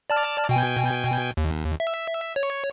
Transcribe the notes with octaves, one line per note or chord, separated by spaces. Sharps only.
D5 A5 F6
B2 G5 G#5
D#2
E5
C#5